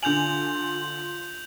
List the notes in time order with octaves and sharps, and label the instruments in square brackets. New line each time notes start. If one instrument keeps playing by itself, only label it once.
[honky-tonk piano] D3 G#5 [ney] F4 [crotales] G6 F7 F#7